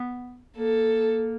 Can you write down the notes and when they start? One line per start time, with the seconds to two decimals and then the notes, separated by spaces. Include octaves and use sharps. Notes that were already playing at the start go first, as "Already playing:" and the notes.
Already playing: B3
0.57 A#3 A4